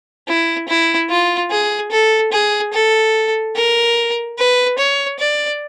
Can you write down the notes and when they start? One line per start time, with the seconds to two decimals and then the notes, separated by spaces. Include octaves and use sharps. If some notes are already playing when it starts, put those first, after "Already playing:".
0.28 E4
0.68 E4
1.09 F4
1.51 G#4
1.91 A4
2.32 G#4
2.73 A4
3.55 A#4
4.38 B4
4.78 C#5
5.19 D5